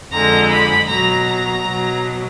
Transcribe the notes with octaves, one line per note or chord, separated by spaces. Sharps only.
F2 D3 G#3 A#5
B5
B2 F#3 A#5
A#5
B2 F#3